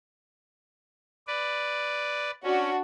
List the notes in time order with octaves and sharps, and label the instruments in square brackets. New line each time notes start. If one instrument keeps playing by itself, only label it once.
[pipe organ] B4 D5
[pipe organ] C#4 [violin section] D4 F#4